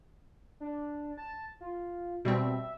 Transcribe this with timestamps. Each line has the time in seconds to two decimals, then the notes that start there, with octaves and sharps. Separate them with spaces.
0.60 D4
1.18 A5
1.61 F4
2.25 B2 G3 C4 E5